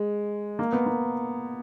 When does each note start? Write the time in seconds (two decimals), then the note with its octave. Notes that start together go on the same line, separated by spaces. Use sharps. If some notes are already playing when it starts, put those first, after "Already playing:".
Already playing: G#3
0.59 A#3
0.73 B3
0.86 A#3